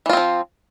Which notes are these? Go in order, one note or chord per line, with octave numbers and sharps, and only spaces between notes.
E3 F3 C4 F4